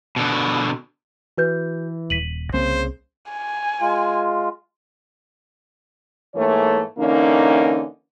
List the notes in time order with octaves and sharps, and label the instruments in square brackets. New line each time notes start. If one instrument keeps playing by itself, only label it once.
[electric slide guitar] B2 D3
[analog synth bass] E3 [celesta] F#4 B4 G6
[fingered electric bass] D#1 [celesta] B6 D#7 F#7
[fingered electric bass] C2 A#3 C4 [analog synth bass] C#3 [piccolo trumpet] C5
[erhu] G#5
[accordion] G#3 F4
[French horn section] G#2 E3 A3 A#3 C#5
D3 E3 A#3 C#4 D#4